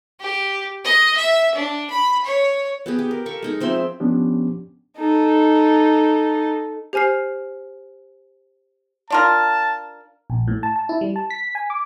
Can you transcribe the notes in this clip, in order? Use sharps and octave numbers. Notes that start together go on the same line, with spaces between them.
G4
D#5
E5
D4
B5
C#5
B3 G4 G#4
G4
A#4
A4 A#4 F5 C#6
G#3 D#4 G#4
F3 C4 E5 C6
F3 B3 C#4 D4 G4
D#4 A4
G4 C5 G#5 F6 C7
D4 F4 A#4 A5
A#1
A2
A5
A5
E4
G3
A5
B6
G#5
D6